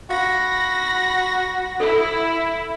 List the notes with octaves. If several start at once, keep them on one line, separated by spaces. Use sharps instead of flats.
F#4 F5 B5 A#6
E4 A4